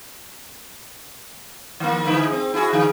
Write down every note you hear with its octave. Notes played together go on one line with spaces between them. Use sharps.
D#3 A#3
G#2 D3 E4
C4
E4 F#4 G#4
D3